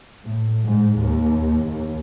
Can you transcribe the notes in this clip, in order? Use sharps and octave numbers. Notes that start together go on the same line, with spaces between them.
A2
G#2
D#2
D#2